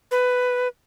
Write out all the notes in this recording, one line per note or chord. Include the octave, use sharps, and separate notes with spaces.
B4